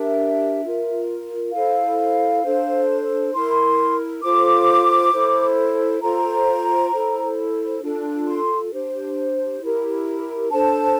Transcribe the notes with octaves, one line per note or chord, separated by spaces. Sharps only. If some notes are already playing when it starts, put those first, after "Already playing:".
Already playing: D4 G4 A#4 E5
F4 A#4
E4 A4 C5 F5
D4 A4 C5
E4 A#4 C6
F4 A4 C5 D6
E4 A4 C5
F4 A4 C5 A#5
E4 A4 C5
D4 F4 A4
C6
D4 G4 C5
E4 G4 A#4
D4 A4 C5 A5